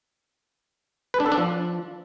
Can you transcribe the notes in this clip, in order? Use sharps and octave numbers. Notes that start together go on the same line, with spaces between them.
B4
D4
A4
D4
F3